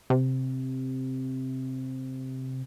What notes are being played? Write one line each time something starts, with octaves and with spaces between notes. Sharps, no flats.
C3